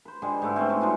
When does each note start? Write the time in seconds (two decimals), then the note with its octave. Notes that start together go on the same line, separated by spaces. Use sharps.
0.05 B4 C5
0.22 D3 G3 G#3
0.42 G#2 A3 E4
0.56 C4 C#4 B4
0.69 B3 D#4 C5
0.81 F#3 G#3 D4 F4